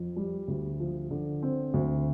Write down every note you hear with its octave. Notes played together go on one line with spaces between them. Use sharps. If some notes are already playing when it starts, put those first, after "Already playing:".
Already playing: F2
G3
D2
F3
D3
C4
D2